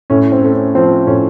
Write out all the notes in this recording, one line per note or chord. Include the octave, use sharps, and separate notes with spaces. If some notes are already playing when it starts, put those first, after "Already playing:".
A2 C#4
C4
A3
C#4
F3 C4
A2 C#4